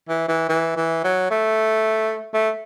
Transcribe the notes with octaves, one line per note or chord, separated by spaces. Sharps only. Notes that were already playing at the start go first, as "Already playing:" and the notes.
E3
E3
E3
E3
F#3
A3
A3